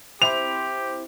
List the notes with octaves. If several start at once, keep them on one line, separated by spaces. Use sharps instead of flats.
C4 E4 G4 C5 F7